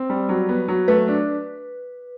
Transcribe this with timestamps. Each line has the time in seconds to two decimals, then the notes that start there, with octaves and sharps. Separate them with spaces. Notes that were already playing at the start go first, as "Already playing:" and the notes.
Already playing: C4
0.10 G3
0.29 F#3
0.49 B3
0.68 F#3
0.88 A3 B4
1.08 D4